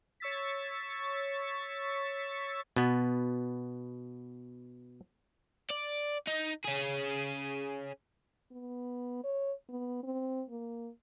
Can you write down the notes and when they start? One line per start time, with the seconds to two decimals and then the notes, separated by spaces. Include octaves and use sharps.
0.20 C#5 C#6 E6 A6 B6
2.76 B2 B3
5.70 D5
6.28 D#4
6.65 C#4 G#4
8.52 B3
9.24 C#5
9.69 B3
10.03 C4
10.50 A#3